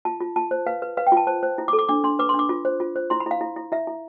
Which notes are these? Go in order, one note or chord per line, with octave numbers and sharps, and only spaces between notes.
F4 A5
F4
F4 A5
C5
B4 F5
B4
B4 F5
G5
F4 A5
C5 A5
C5
E4
D6
A4
D6
D4 D6
D4 C6
B4 D6
C6
D4
D6
F4
C5
F4
C5
E4 C6
B5
E4 F5
E4
E4
E4 E5
E4